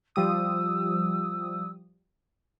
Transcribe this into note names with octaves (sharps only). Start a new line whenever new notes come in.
F3 G3 D#6 E6